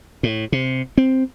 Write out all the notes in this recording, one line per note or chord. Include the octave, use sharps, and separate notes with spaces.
A2
C3
C4